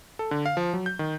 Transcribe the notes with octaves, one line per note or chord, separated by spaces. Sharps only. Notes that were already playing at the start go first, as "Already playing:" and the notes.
A4
D3
F5
F3
F#3
G6
D#3